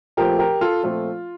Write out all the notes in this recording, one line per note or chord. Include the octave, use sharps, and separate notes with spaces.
A#2 F3 A3 C4 G4 A#4
G4 A#4
F4 A4
A#2 F3 A3 C4 F4